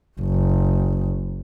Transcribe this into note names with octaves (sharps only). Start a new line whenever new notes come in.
F#1